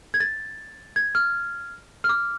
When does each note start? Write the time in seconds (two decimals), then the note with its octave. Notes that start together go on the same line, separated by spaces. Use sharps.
0.14 G#6
0.20 A6
0.96 G#6
1.15 F6
2.04 F6
2.09 D6